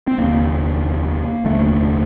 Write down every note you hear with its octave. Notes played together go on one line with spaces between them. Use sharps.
C4
F1 D#2 D3 A#3
F1 D#2 D3 A3